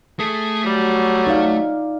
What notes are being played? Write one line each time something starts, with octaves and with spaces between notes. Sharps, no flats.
A3 G#4 A4
F#3 G3
D#4 D5 F5